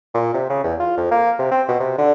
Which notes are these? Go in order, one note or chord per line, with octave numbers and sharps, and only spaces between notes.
A#2
C3
C#3
E2
F4
F2
A#3
C3
C4
B2
C3
D3